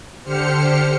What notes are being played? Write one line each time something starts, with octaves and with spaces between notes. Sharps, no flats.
D3 G4 C5 F6 C#7